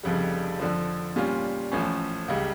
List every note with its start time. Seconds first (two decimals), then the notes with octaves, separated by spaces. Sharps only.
0.03 F1 F2 C#3 G3
0.59 F2 D3 F3
1.16 A#2 G3 C#4 F4
1.72 A1 A2 F3 A3 C#4
2.28 C#2 C#3 G3